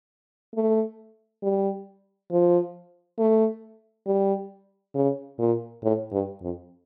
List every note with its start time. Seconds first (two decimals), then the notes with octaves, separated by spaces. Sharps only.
0.55 A3
1.43 G3
2.31 F3
3.19 A3
4.07 G3
4.95 C#3
5.39 A#2
5.84 A2
6.12 G2
6.42 F2